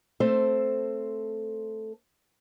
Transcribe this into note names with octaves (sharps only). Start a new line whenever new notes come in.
A3 C4 A4 C5